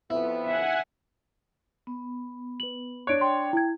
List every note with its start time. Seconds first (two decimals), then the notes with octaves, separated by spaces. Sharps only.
0.10 F2 B3 E4
0.45 E5 F#5 G#5
1.87 B3
2.60 B4 F#7
3.07 D4 C#5 F#6 D7
3.21 G5 C6
3.53 E4 G#6